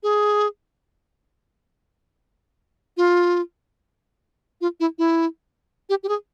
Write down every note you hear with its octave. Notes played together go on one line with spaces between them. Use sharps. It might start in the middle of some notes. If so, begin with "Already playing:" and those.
G#4
F4
F4
E4
E4
G4
G4
G#4